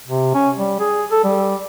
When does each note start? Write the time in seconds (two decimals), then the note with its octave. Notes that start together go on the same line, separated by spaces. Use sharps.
0.07 C3
0.34 C#4
0.56 G3
0.80 G#4
1.11 A4
1.24 G3